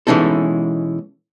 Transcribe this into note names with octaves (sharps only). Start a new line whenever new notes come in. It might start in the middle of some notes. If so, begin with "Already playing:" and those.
B2 E3 G#3 C#4 D#4 A4